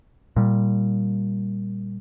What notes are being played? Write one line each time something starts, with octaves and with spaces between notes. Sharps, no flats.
A#2 G3